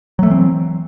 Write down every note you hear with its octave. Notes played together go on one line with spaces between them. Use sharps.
E3 F#3 A3 C4